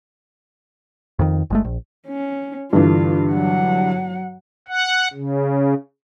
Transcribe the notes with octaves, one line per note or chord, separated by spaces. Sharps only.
F2 D#3
G1 G#3 A3
A#1
C#4
G2 D3 E3 F4
F#3 F#5
F#5
C#3